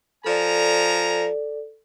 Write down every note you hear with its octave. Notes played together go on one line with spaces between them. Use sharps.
F3 A4 D5 G#5 A#5